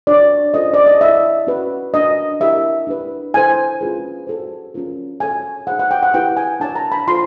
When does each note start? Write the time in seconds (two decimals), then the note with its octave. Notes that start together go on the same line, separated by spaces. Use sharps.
0.07 D4 F#4 A#4 C#5 D5
0.54 C#4 F4 A4 C5 D#5
0.74 D5
0.87 D#5
1.00 E4 A4 C#5 E5
1.47 C#4 F#4 B4
1.94 D4 F#4 A#4 D#5
2.40 E4 G4 A#4 E5
2.87 D4 G4 B4
3.34 E4 A4 C5 G#5
3.81 C#4 F4 G#4 B4
4.27 F#4 A4 C5
4.74 C#4 F4 A#4
5.20 F#4 A4 C#5 G#5
5.67 D#4 G#4 C5 F#5
5.79 F#5
5.91 G5
6.03 F#5
6.14 E4 G4 B4 G5
6.37 G#5
6.60 D4 F#4 A#4 C#5 A5
6.76 A#5
6.92 B5
7.07 F4 A4 C5 C6